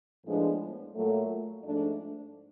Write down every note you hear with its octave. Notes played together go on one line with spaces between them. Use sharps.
A2 F3 G#3 B3 D4
A#2 F#3 A3
G#2 F3 A3 D4